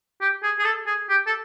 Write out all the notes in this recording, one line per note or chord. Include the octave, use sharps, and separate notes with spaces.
G4
G#4
G#4
A4
G#4
G4
A4